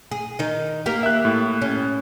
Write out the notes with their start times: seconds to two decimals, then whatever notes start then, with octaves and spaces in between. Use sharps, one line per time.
0.11 G#4
0.39 D#3 D#4
0.86 A#3 G4 A#4
1.03 E5 F#6
1.25 A2
1.62 C#4